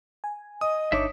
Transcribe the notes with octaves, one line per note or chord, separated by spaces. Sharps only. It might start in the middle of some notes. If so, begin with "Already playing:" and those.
G#5
D#5 D#6
G1 D4 D#4 C#5 E5 D6